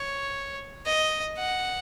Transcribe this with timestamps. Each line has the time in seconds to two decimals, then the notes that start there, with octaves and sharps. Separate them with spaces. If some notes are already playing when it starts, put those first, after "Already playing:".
Already playing: C#5
0.86 D#5
1.38 F#5